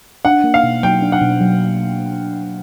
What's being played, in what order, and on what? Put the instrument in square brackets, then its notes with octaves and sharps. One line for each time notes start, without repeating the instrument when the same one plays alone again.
[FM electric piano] D4 [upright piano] F#5
[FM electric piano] A#3
[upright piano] F5
[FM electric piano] B2
[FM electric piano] F#3 [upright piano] G5
[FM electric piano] D4
[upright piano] F#5
[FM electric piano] B2
F#3